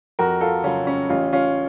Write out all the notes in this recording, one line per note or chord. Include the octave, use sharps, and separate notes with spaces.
F2 F#4 A#4
F4 A4
C#3 F#3 C#4 F4
C#4
A1 C#4 F4
C#4 F4